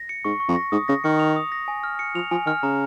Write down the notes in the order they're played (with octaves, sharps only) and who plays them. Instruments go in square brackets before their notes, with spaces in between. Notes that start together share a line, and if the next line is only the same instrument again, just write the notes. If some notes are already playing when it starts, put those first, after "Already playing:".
Already playing: [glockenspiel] A#6
C#7
[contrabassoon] G#2 [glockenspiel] C#6
[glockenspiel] C#6
[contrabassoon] F2
[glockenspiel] A#6
[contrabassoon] G#2 [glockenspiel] D#6
[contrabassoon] C#3 [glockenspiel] A#6
[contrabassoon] D#3 [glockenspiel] C#7
[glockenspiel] F7
D#6
A#6
G#5
F6
C#7
[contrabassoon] F3 [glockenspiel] F7
[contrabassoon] F3 [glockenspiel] G#5
[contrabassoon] D#3 [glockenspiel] F6
[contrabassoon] C#3 [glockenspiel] A#5